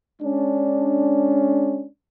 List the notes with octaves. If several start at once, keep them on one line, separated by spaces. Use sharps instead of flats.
G#3 C#4 D4